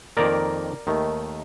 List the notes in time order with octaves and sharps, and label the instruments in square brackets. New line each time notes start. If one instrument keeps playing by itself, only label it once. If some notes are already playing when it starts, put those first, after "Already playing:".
[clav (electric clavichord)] F2 D#3 A#3 A#4 D5
D#2 D#3 A3